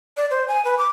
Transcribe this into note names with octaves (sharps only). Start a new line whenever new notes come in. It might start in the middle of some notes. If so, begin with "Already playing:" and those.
D5
C5
G#5
B4
D6